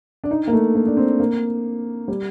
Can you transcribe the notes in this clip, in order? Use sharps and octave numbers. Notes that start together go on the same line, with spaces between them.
D4
D#4
A#3
A3
A#3
D4
C4
A#3
G3